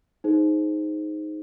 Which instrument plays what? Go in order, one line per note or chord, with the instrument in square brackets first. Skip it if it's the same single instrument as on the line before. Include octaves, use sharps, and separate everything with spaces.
[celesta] D#4 G#4 C5